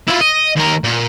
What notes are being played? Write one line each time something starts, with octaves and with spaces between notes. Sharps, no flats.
E4 F4
D#5
D#2 A#4
A#2